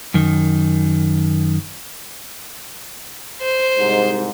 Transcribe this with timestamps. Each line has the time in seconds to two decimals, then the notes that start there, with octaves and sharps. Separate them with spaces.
0.14 F#2 D#3
3.41 C5
3.78 C2 G#2